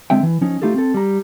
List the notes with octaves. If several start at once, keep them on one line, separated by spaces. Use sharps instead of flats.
D3 G#3 C4 E5 G5
E3
F3 C#4 D#4
A3 D#4 F4 G4 A4
C4 A4
G3 A#5